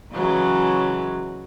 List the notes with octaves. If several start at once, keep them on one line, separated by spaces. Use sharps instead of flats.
C#3 E3 F#3 G#3